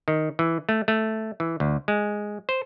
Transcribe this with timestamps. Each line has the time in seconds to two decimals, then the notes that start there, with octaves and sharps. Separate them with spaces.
0.08 D#3
0.39 E3
0.69 A3
0.88 A3
1.40 E3
1.60 D2
1.88 G#3
2.49 C5